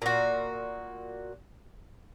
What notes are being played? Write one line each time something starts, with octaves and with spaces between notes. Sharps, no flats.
A#2 F#4